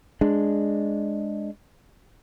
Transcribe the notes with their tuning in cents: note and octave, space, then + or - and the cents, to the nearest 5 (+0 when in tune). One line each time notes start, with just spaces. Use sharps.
G#3 +0 D4 +0